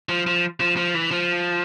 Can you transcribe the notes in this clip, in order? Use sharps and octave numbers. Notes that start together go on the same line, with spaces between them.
F3
F3
F3
F3
E3
F3